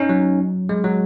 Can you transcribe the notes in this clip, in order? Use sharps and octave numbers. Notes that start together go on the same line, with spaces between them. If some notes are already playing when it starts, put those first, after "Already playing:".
Already playing: C#4 D#4
F#3
G#3
F#3